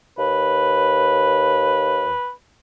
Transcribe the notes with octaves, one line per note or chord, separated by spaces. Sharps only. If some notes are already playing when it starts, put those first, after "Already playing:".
D#2 B4